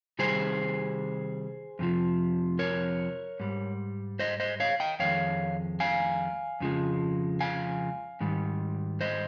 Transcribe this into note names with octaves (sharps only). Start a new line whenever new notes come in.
C3 D#3 G3 G#4 C5
F2 C3 F3
A#4 C#5
G#2 G3
C5 D#5
C5 D#5
C#5 F5
D#5 G5
F2 D#3 G#3 C#5 F5
F5 G#5
F2 C#3 F3 G#3
F5 G#5
G#2 D#3 G3
C5 D#5